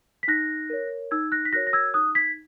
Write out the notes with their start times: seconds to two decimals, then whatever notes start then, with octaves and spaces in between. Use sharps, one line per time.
0.23 B6
0.28 D#4 F#6 A#6
0.70 A#4 C#5
1.11 D#4 E6 G#6
1.32 F#6 A#6
1.45 B6
1.53 F#4 A#4 C#5 F#6 A#6
1.67 A#6
1.73 E6 G#6
1.94 D#4 D#6 F#6
2.15 G#6 B6